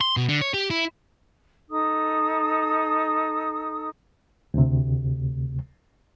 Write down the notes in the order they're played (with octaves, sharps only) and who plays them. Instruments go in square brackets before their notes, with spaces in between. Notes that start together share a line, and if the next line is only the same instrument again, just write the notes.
[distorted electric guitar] C6
B2
D3
C#5
G4
E4
[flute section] D#4 A4 D#6
[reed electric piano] D2 C3